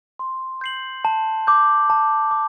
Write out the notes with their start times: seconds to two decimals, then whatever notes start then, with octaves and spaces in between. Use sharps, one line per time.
0.19 C6
0.61 G6 C7 F#7
1.05 A5
1.47 D6 G6
1.90 A5
2.31 D6